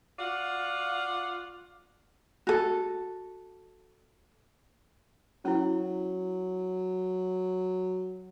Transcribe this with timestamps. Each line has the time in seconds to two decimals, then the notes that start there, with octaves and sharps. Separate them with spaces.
0.18 F4 F#4 D5 F5 F#5
2.47 F#4 A4
5.45 F#3 C#4 E4